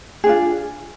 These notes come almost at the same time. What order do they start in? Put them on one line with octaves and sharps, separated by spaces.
G#4 D4 F4